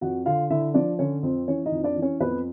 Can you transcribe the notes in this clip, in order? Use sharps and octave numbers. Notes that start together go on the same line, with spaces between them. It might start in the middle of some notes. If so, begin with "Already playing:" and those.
F2 F#4 F#5
D3 F4 F5
D3 E4 E5
F3 D4 D5
D3 C#4 C#5
F2 C4 C5
E3 C#4 C#5
D#4 D#5
F2
D4 D5
E3
C#4 C#5
F2 B3 B4